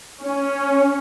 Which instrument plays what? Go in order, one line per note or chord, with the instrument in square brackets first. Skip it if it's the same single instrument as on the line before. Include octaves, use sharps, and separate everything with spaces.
[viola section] C#4